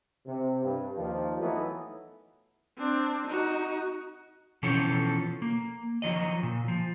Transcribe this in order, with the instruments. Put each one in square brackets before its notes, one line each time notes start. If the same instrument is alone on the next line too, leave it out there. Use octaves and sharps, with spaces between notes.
[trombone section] C3
G2
D#2 F3
E3 F#3 A3 B3 D#4 B4
[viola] C4 D4
D#4 F#4
[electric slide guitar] B2 E3 F3 C4 C#4 A4
A#3
D#3 F3 F#3 D#5
A#2
F3